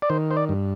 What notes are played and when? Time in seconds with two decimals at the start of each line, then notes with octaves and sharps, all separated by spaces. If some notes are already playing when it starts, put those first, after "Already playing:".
0.02 D5
0.10 D#3 C5
0.31 C5
0.37 D5
0.49 G2